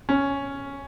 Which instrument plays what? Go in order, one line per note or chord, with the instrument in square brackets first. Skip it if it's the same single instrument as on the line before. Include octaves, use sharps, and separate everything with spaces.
[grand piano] C#4